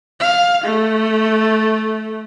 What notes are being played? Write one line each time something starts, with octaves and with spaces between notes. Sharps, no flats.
F5
A3